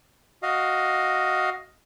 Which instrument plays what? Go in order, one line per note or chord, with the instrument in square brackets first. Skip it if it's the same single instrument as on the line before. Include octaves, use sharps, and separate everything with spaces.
[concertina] F#4 D#5 F5